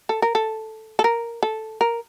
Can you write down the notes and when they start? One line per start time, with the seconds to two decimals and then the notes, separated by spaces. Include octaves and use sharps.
0.09 A4
0.22 A#4
0.35 A4
0.99 A4
1.04 A#4
1.43 A4
1.81 A#4